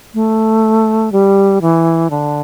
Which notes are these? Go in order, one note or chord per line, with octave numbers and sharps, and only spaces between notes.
A3
G3
E3
D3